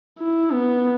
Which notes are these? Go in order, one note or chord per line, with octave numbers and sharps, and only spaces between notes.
E4
B3